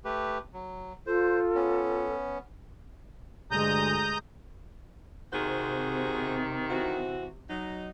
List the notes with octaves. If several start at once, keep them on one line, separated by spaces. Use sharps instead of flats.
A3 G4 B4
F#3
F4 A4 C5
B3 C#4
D2 G2 G#3 A#5 D#6 G6
C3 D#3 F#4 G#4 C5
E3 C4 F#4
F#3 D#4